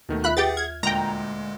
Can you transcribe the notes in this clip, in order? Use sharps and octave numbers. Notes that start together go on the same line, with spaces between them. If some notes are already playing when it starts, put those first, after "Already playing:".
D#2 B2 D#3 A3
F4 E5 B5 F#6
G4 G#4 B4 F#5 G5 A6
F6 G#6
D2 A#2 G#3 G5 A#5